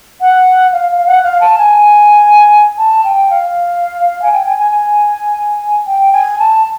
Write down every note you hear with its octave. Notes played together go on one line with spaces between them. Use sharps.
F#5
F5
F5
F#5
F5
A5
G#5
A5
G5
F5
G#5
G5
G#5
G#5
G#5
G5
G#5
A5